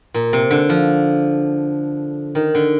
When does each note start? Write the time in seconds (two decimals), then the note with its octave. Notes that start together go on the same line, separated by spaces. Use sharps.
0.14 A#2
0.33 C3
0.51 D3
0.69 F3
2.35 D#3
2.55 D3